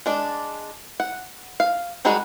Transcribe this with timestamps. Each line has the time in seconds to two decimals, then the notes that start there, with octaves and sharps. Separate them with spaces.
0.06 G#3 D4 D5
1.00 F#5
1.60 F5
2.05 D#3 G3 G#3 F#4 G#4